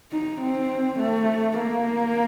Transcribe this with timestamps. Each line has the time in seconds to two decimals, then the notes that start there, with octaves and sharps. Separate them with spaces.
0.12 D#4
0.41 C4
1.00 A3
1.59 A#3